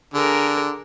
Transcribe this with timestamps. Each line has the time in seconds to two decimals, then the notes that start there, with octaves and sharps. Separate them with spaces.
0.14 D3 G#4 A#4